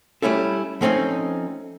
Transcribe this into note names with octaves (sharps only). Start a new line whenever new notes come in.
G3 A3 C#4 E4 A4
F3 A3 C4 C#4 D#4